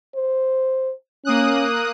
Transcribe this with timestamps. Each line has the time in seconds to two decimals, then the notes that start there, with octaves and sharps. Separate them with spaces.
0.15 C5
1.25 A#3 C#4 D#6 F#6